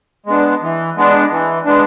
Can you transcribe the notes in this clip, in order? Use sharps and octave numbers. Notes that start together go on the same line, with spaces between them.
G#3 B3 D4
E3
G#3 B3 D4
E3
G#3 B3 D4